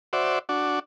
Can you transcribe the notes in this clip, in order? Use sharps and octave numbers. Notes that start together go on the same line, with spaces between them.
F#4 C5 D5 E5
D4 F#4